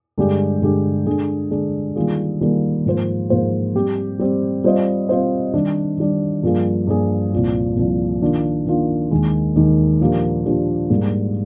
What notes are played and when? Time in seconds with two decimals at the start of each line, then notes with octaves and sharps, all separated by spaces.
0.18 G2 D3 G#3 D4 G4
0.62 G2 D3 G#3 D4 G4
1.06 D3 G#3 D4 G#4
1.51 D3 G#3 D4 G#4
1.96 D#3 G3 A#3 F4 G#4
2.41 D#3 G3 A#3 F4 G#4
2.86 G#2 F3 A#3 F4 C5
3.30 G#2 F3 A#3 F4 C5
3.75 G3 C4 G4
4.19 G3 C4 G4
4.64 G3 C4 F4 C5 D#5
5.08 G3 C4 F4 C5 D#5
5.54 D#3 G3 D4
5.98 D#3 G3 D4
6.43 G2 F3 A#3 F4 G#4
6.87 G2 F3 A#3 F4 G#4
7.32 C2 A#2 F3
7.77 C2 A#2 F3
8.22 D#3 A#3 D4 F4
8.66 D#3 A#3 D4 F4
9.11 D#2 D#3 G#3 D#4
9.56 D#2 D#3 G#3 D#4
10.00 A#2 F3 A#3 D4 G4
10.45 A#2 F3 A#3 D4 G4
10.90 G#2 G3 A#3